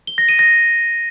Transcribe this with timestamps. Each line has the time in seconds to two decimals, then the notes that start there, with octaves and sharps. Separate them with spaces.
0.07 G7
0.18 A#6
0.29 D#7
0.39 A#6